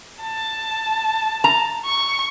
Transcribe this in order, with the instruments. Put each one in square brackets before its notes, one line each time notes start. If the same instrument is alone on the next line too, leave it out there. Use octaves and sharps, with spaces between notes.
[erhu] A5
[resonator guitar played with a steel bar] A#5
[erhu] C#6